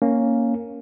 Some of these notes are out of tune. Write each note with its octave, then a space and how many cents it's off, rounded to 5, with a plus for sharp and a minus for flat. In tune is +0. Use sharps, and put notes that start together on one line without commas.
A#3 +0 C#4 +0